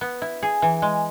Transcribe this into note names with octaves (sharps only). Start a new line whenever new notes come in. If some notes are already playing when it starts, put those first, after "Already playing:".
B3
E4
G#4
E3
G#3